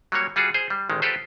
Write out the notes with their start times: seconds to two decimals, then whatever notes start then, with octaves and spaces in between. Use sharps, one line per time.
0.12 F#3 G3 A#3 C#5
0.36 G3 F4 F#4 G#4
0.54 G#4 C5
0.70 G3
0.89 A1 D#3 G#3
1.02 F4 G4 A4 B4 C5